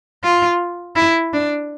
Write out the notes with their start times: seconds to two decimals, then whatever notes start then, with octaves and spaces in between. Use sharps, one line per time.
0.24 F4
0.96 E4
1.34 D4